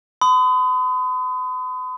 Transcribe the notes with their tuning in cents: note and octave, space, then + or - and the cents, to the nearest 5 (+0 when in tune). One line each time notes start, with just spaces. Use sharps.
B5 +45 D#6 +0